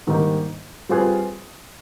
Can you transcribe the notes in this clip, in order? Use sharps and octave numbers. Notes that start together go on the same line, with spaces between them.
G#2 D#3 G3 A#3 D#4
G3 C4 F4 G#4 B4